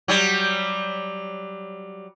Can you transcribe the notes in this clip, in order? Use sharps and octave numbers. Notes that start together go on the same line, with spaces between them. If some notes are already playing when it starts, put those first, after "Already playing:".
F#3 G3